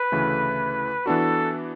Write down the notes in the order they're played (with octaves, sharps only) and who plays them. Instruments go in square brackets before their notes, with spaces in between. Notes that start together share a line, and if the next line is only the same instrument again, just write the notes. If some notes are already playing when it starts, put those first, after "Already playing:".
Already playing: [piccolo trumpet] B4
[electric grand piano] D2 C#3 E3 A3
[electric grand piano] E3 B3 D4 F#4 [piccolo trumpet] A4